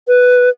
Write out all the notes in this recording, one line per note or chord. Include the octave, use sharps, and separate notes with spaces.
B4